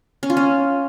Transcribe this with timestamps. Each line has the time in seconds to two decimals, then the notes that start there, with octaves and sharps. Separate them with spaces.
0.23 C#4
0.30 F4
0.37 C#4